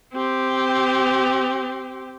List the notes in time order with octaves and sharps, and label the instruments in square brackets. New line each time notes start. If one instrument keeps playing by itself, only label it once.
[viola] C4 G4